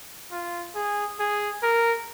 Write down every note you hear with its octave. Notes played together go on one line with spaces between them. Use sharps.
F4
G#4
G#4
A#4